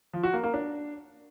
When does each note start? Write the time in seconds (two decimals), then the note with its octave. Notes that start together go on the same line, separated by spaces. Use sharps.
0.13 F3
0.23 F#4
0.33 A#3
0.44 A#3
0.54 D4